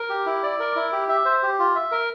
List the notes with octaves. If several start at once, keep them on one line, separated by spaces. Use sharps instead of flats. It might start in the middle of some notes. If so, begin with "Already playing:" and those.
Already playing: A#4
G4
E4
D5
A#4
E4
G4
E5
C5
G4
F4
E5
A#4